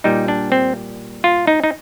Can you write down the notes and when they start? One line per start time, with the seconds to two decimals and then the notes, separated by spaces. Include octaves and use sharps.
0.04 A#2 G3 D#4
0.28 D4
0.52 C4
1.24 F4
1.47 D#4
1.64 D#4